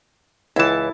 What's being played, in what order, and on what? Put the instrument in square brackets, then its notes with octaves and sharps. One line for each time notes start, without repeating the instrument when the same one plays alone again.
[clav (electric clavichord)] C#2 E3 [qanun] E4 A5